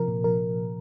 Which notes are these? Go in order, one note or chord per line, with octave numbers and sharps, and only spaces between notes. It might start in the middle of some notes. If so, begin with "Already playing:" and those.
Already playing: C3 F3 A#4
A#2
F3 A#4